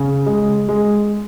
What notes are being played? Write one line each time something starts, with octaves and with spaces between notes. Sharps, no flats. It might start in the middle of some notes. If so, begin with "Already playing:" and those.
Already playing: C#3
G#3
G#3